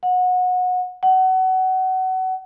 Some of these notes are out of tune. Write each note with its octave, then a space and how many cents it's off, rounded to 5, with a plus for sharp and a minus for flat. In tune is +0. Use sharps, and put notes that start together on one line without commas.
F#5 -25
F#5 +25